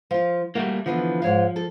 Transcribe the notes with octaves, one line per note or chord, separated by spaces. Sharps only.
F3 F4
G3 A3 A#3 F#4
D3 E3 F3 B3
G#2 C#5 F5
A4